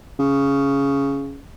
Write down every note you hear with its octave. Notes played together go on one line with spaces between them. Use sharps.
C#3